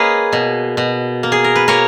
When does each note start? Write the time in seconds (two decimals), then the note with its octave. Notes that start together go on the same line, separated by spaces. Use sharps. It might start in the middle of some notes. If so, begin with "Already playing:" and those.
Already playing: A#3 G#4 B4 C#5 D#5
0.33 B2
0.77 B2
1.23 A#3
1.32 G#4
1.44 A#4
1.55 B4
1.68 A#3 A#4 C#5